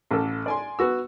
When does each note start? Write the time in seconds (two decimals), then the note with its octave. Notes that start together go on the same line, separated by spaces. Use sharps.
0.11 A1 A4
0.46 D5 G#5 C6
0.79 B3 F#4 E6